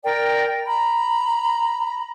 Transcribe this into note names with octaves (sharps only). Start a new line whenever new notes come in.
A#4 D5 G5
A#5 B5